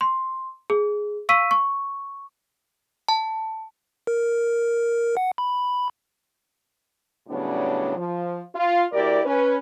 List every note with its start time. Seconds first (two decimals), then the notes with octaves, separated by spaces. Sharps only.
0.01 C6
0.70 G#4
1.29 F5 C#6 E6 B6 D#7
1.51 C#6
3.08 A5
4.07 A#4
5.17 F#5
5.38 B5
7.28 A2 C#3 F#3 G3 B3 D4
7.96 F3
8.55 F4
8.93 D2 E4 G4 A#4 D5
9.25 C#4 B4